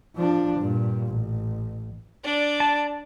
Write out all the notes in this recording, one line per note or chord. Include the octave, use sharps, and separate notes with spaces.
F3 D4
G2 A#2
A1
D4 D5
A5